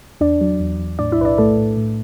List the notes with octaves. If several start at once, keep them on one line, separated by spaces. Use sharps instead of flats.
E2 D4 D5
F#3
E2
E2
A2 D4 D5
E4 E5
B1 B4
D4 D5
A2 A3 A4
A2
A2